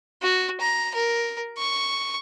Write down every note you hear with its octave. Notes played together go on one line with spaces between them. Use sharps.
F#4
A#5
A#4
C#6